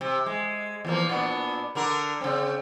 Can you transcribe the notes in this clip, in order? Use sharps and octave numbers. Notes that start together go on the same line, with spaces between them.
C3
G#3
E2 F3 A#3
A#2 B3 D4
D3 D4 A#4
C#3 C4